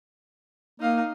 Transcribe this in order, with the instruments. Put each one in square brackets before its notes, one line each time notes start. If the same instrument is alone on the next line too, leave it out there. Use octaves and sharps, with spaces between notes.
[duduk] A#3 [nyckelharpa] D#4 F5